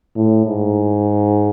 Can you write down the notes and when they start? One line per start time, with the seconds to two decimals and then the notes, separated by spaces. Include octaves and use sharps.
0.16 A2
0.46 G#2